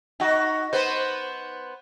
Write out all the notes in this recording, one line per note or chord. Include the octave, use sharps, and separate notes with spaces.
D#4 F#4
B3 B4 C5